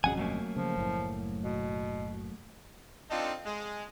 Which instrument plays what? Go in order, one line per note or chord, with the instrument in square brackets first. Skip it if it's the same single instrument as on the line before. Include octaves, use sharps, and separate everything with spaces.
[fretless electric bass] G1 F2 C#4 [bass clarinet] B2 [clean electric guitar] G#4 F#5 G#5
[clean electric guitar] F#3 A3 A#3
[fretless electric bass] C#3 [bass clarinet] F3
[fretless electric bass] F#1 A2
[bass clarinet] B2
[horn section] C4 D4 D#4 F4 A4
G#3